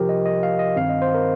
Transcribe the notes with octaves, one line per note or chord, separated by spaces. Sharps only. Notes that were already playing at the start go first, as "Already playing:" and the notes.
Already playing: C2 C3 F3 G4 A#4
D#5
D#5
F5
D#5
G2 D#3 C4 F5
D#5
C5
A#4